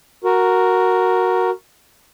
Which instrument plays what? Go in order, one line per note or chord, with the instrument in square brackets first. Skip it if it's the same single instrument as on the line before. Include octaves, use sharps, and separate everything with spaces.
[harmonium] F#4 A#4